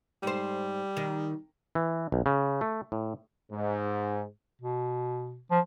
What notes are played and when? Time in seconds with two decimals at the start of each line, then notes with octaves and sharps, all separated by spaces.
0.23 G#2 G3 C5
0.97 D#3
1.75 E3
2.12 B1
2.26 C#3
2.61 A3
2.92 A2
3.51 G#2
4.61 B2
5.51 F3